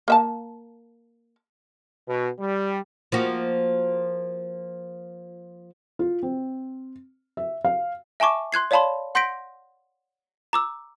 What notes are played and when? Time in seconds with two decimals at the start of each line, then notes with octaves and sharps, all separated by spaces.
0.08 A#3 E5 A5
2.07 B2
2.39 G3
3.12 F3 A#3 F#4
5.99 F4
6.23 C4
7.37 E5
7.65 F5
8.20 E5 G#5 A5 C#6 D6
8.52 C6 F#6 G#6 C7
8.71 C#5 D5 F5 A5 B5 C6
9.15 F#5 C6 G6 A#6 B6 D7
10.53 A#5 D6 E6